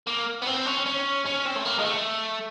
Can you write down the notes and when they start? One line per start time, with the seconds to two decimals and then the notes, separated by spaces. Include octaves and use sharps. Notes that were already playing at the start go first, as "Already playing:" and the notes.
0.07 A#3
0.42 B3
0.47 C4
0.66 C#4
0.86 C#4
1.26 C#4
1.46 C4
1.56 A3
1.65 A#3
1.79 G#3
1.85 A3